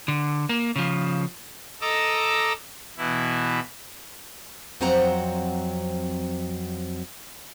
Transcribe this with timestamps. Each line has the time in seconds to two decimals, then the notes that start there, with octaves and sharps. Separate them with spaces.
0.08 D3
0.49 A#3
0.76 C#3 F3
1.81 A4 D#5 A#5 D6 E6
2.97 B2 E3 E4
4.81 F2 F#3 C4 C5 F#5 A#5